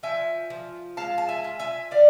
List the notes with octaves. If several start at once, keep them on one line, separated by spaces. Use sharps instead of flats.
F3 E5 G#5
F3
G#3 F5 A5
A5
E5 G#5
F4
E5 G#5
D3 D5 F5